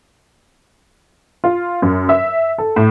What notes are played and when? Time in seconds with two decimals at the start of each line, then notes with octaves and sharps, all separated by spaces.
1.44 F4
1.82 F#2
2.09 E5
2.58 A4
2.76 A2